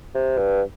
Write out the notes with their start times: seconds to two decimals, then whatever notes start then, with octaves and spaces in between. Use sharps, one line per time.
0.15 C3
0.37 G2